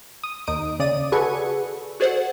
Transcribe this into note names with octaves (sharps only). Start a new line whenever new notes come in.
D#6
D#2 D#4 D#6 D7
C#3 D5 D#6 D#7
F#4 G#4 A4 B4 G#5 C#6
F#4 G#4 A4 C5 D5 F#5